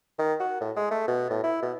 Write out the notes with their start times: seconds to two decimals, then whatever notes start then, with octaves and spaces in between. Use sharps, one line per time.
0.19 D#3
0.40 F#4
0.61 A2
0.76 G#3
0.91 A3
1.08 B2
1.30 A2
1.44 E4
1.63 B2